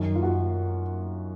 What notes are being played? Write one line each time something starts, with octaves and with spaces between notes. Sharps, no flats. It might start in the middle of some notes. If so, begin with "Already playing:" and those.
Already playing: F#2 D#3
F4
F#4